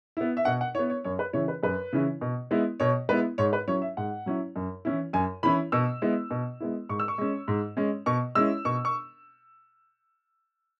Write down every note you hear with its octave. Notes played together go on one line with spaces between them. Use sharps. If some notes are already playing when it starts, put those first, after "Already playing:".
B3 E4
E5
B2 F#5
F#5
B3 E4 C#5
C#5
F#2 C#5
B4
C#3 E3 C#4 E4 C#5
B4
F#2 B4
C#3 E3 C#4 E4
B2
G#3 B3 E4
B2 C#5
G#3 B3 E4 B4
G#2 C#5
B4
F#3 C#4 E4 C#5
E5
G#2 F#5
F#3 C#4 E4
F#2
E3 C#4 E4
F#2 G#5
E3 C#4 E4 B5
B2 E6
G#3 B3 E4
B2
G#3 B3 E4
G#2 C#6
E6
C#6
G#3 C#4
G#2
G#3 C#4
B2 C#6
G#3 C#4 E4 E6
B2 C#6
C#6